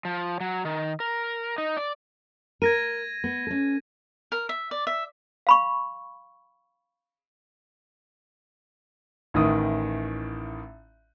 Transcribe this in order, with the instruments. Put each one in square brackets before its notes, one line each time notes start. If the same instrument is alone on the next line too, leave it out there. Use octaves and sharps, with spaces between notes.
[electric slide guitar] F3
F#3
D#3
A#4
D#4
D5
[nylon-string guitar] A#4 [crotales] G#6 A#6 D#7
[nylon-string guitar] B3
C#4 A4
[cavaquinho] A#4
E5
D5
E5
[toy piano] F5 B5 C#6
[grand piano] A1 A2 D#3 D#6